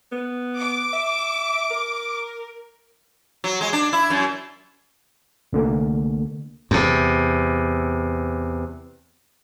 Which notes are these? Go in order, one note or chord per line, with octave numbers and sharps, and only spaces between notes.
B3
D6
E5
A#4
F#3
G#3
D4
E4
F#2
C2 D3 A3 A#3
E2 C3